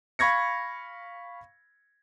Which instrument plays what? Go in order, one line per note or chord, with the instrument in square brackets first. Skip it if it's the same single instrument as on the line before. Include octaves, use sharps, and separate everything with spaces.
[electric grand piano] F5 B5 C#6 G#6 A#6 C#7